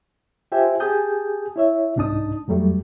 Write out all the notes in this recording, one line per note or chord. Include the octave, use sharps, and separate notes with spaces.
F4 G4 C5 E5 G5 G#5
G4 G#4 G#5 A5 D#6 G6
E4 C#5 E5
C2 G#2 D4 D#4 A5 D#6
F2 F#3 G3 A3